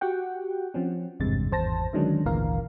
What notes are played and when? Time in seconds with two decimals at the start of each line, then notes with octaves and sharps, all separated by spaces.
0.01 F#4 G4 F#5 G5
0.74 F3 C4 C#4
1.20 G#1 E2 G2 C3 G#3 A6
1.51 G#1 E2 C5 A5 A#6
1.93 D3 D#3 F#3 G#3 C#4 D4
2.26 G#1 D2 A#2 E3 A#4 F5